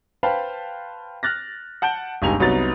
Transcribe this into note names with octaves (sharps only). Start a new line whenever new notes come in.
B4 C5 F5 G5 A5 B5
F6 F#6 A6 A#6
F#5 A5 G6 D7 G7
G1 C#2 D#4 G4 G#5 F7
C2 F#3 B3 D#4 A6